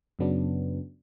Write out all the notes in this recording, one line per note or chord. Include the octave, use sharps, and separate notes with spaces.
F#2 C#3 F#3 B3 D4